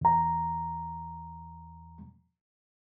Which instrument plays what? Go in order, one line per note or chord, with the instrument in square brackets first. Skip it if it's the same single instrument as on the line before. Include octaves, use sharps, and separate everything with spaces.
[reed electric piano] E2 A#5